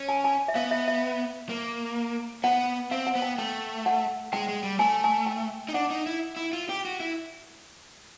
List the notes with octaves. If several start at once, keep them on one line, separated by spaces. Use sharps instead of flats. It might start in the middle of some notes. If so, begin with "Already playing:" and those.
Already playing: C#4
G#5
G#5
E5
B3 F5
E5
E5
A#3
B3 F#5
C4 F5
F#5
B3
G5
A3 G5
F#5
G#3 G5
G#3
G3
A3 G#5
G#5
G5
D#4
D4 F#5
D#4
E4
E4
F4
G4
F#4
E4